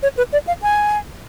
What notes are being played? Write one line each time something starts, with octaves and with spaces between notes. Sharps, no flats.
C#5
B4
D5
F5
G#5